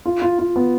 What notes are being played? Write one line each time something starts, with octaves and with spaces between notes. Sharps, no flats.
F4
F4
F4
B3